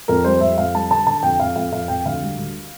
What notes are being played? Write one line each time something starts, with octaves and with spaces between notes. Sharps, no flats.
F2 A#4
G3 C5
F2 E5
F2 F5
G3 A5
D3 A5
D3 A5
F2 G5
F2 F5
F2 F5
F2 F5
F2 G5
D2 F5
G3
D2